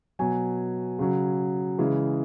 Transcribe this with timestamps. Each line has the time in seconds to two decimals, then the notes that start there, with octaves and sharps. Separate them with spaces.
0.19 B2 F#3 G#5
0.99 C#3 F#3
1.78 C#3 E3 G#3